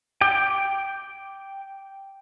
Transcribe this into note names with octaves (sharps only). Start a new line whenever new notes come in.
G5 D6